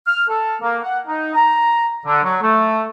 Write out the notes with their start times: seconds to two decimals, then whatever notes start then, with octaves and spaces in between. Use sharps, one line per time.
0.07 F6
0.28 A4
0.61 A#3
0.82 F#5
1.07 D#4
1.34 A#5
2.05 D3
2.24 F#3
2.42 A3